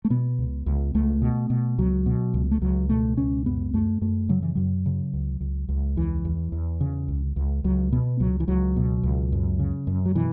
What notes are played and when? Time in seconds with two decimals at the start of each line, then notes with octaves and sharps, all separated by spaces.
0.05 A3
0.10 B2 B3
0.38 C#2
0.66 C#2
0.94 C#2 A3
1.22 B2
1.50 B2
1.78 C#2 F#3
2.06 B2
2.34 C#2
2.51 A3
2.61 C#2 F#3
2.89 B2 A3
3.17 C#2 C#4
3.46 F#2 B3
3.74 F#2 A3
4.01 F#2 A3
4.29 C#3 F#3
4.43 E3
4.55 F#2 F#3
4.86 C#3
5.13 C#2
5.41 C#2
5.69 C#2
5.97 E2 E3
6.25 E2
6.52 E2
6.81 C#3
7.08 C#2
7.36 C#2
7.64 C#2 F#3
7.92 B2 B3
8.20 C#2 F#3
8.40 E3
8.48 C#2 F#3
8.76 B2
9.03 C#2
9.32 F#2
9.59 C#3
9.87 F#2
10.06 F#3
10.15 B2 E3